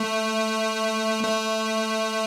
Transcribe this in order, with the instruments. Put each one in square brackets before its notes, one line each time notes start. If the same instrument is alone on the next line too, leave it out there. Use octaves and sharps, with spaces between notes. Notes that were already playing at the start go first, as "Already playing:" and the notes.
Already playing: [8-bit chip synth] A3
A3